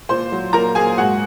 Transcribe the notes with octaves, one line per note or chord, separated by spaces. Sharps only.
A#2 C5 C6
F#3
A#2 A#4 A#5
A#3 G#4 G#5
G#2 F#4 F#5